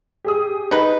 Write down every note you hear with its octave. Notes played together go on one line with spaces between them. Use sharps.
G4 G#4 D#6
D#4 B4